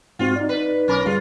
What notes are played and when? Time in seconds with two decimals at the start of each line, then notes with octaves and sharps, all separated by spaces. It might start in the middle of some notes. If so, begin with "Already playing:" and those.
0.19 G#2 C4 F4 F#4
0.36 D#4 D5
0.49 B4
0.88 B1 C#4 A#4 B5 D6
1.06 G1 G3 F4 G#4